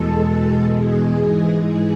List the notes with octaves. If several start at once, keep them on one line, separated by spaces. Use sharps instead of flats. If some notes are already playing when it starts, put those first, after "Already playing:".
Already playing: E2 B2 G#3 A4
G#4
G#2 E3 G#3
G#4